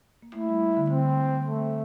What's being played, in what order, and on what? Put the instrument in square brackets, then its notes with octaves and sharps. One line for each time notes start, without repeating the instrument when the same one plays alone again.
[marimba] A#3
[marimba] A3 [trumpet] E4
[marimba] G3
D3
[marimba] D3 [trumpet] C4
[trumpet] A3